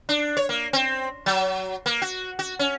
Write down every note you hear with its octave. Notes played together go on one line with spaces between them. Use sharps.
D4
C#5
A#3
C4
F#3
A#3
F#4
F#4
C#4